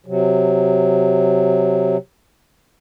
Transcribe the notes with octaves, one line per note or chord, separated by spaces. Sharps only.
C3 F#3